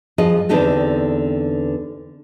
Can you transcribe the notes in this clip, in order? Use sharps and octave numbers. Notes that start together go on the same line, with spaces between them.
F2 F3 G#4 D#5
E2 D3 C4 D#4 G4 A4